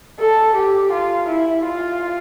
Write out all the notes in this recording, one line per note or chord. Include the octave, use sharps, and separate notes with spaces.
A4
G4
F4
E4
F4